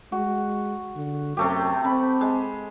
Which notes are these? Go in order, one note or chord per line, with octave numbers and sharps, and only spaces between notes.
G#3 F#4
D3
F#2 C3 A3 G4
C4 B5
G#3